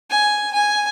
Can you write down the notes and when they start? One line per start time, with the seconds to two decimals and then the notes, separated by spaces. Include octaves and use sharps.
0.10 G#5
0.53 G#5